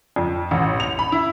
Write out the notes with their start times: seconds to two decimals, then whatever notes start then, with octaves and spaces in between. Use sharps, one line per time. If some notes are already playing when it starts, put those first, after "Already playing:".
0.16 F2
0.51 A1
0.80 F7
0.99 B5
1.12 E4